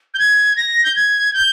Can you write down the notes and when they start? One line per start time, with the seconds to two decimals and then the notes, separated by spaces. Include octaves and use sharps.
0.14 G6
0.19 G#6
0.57 A#6
0.84 G6
0.96 G#6
1.34 G6